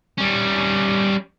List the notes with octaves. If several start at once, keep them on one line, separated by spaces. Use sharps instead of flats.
G3 C#4